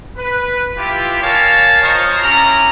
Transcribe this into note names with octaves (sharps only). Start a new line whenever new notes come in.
B4
E4 F4 G4
A#4 C#5 F5 G#5 A5
F4 C5 C#5 D#5 A#5 C#6
C#4 E4 G4 A#5